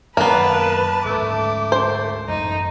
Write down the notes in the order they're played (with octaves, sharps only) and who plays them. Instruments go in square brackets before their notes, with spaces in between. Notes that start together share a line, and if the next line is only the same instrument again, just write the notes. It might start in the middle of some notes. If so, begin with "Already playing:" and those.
[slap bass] F#2 D#3 [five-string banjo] A#3 B3 [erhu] B4 [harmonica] A5
[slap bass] D2 G#2 C#4 [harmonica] A3 [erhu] D6
[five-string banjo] C5
[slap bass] A1 F#2 [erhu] D#4